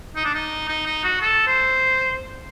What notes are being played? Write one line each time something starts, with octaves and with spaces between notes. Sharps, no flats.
D#4
D4
D#4
D#4
D#4
F#4
A4
C5